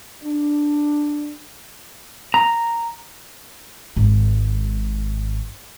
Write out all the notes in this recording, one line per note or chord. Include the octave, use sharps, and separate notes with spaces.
D4
A#5
G#1 G#2